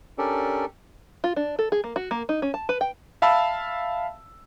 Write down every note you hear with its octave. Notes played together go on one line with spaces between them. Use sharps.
C#4 D4 G4 A4 A#4 D5
F4
D4
A4
G#4
A#3
F#4
A#3
D#4
C#4
A5
B4
G5
E5 F5 A5 B5 E6